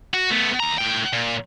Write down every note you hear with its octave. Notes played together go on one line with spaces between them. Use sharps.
F#4
A3 B3
D#2 A#5
A2 G5
A#2